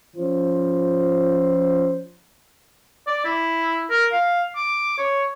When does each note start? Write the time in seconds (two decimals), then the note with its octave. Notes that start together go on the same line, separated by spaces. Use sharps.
0.16 F3 C#4 F4 C5
3.07 D5
3.25 E4
3.90 A#4
4.12 F5
4.56 D6
4.98 C#5